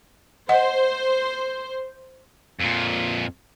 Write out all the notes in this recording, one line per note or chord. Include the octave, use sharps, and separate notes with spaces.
C5 D#5 F#5
F2 A#2